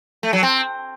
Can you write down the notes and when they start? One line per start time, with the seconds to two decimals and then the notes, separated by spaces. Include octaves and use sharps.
0.23 A3
0.33 F#3
0.43 C4